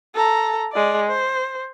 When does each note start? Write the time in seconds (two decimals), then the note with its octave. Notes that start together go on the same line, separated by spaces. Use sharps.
0.15 A4 A#5
0.73 G#3 D5
1.07 C5